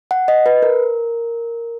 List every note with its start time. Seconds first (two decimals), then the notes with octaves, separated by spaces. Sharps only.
0.11 F#5
0.28 D#5
0.46 B4
0.63 A#4